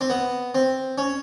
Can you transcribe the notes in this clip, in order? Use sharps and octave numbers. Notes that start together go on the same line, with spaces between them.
C4
B3
C4
C#4